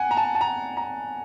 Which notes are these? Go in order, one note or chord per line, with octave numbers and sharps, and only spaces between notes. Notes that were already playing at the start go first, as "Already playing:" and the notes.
Already playing: F#5 G#5
A#5
A5
A5
A#5
A#5